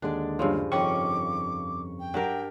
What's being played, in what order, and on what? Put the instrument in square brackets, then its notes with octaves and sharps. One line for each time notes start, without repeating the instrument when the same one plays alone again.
[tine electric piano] D#2 D3 G#3 [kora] D4 D5
[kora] G2 C#3 F3
[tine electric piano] F2 C#6 [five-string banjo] D#3 C#4 [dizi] D6
[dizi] G5
[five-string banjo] F#3 [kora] D4 G4 A#4